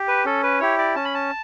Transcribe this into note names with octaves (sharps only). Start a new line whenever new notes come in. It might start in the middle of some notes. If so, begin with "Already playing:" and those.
Already playing: G4
B4
C#4 A4
B4
E4 G4 C#5
D5
C#4 A5
B5
A5